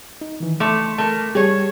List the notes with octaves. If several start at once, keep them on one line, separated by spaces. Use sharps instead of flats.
D#4
D#3 E3
A3 E5 C6 D6
A3 A#4 A5
G3 G4 G#4 C#5